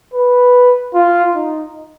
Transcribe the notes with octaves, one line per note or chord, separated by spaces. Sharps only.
B4
F4
D#4